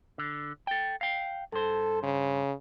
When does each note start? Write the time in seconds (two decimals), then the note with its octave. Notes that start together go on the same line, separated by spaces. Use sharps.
0.18 D3
0.67 A4 G5
1.01 F5 G5
1.53 G2 A4 C5
2.03 C#3